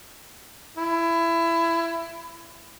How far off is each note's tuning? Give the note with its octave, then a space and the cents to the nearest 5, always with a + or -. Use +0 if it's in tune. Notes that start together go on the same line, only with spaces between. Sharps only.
E4 +20